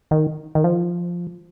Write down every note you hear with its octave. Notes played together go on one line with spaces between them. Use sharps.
D#3
D#3
F3